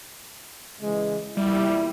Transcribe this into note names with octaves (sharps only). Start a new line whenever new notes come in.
C#3 E3 G#3
E2 A#2 G3 E4